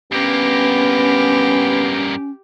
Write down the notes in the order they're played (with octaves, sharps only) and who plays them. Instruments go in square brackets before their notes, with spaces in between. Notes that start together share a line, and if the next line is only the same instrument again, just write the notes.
[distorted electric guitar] G2 A#3 [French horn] B3 [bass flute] C#4 [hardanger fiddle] G4